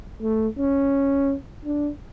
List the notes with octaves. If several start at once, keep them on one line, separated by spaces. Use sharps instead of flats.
A3
C#4
D4